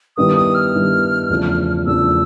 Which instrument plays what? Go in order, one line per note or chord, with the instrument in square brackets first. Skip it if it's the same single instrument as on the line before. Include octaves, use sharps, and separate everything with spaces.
[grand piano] G2 D#3 G3 B3 E4 [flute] D#6
[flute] D#6
F6
[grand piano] G2 D#3 G3 B3 E4
E2 C#3 F3 A3 D4
[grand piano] E2 C#3 F3 A3 D4 [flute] E6